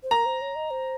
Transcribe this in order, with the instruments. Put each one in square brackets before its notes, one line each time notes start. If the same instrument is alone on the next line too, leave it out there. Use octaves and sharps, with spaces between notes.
[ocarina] C5
[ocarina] A#4 [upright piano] A#5
[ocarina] C5
C#5
D#5
C5